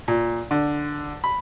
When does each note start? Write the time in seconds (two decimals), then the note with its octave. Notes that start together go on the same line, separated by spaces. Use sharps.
0.08 A#2
0.51 D3
1.24 B5